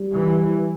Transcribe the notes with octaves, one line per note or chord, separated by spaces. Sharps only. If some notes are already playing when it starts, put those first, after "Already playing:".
Already playing: G3
E3